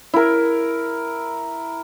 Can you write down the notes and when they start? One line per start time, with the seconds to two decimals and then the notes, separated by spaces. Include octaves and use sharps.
0.14 E4 A#4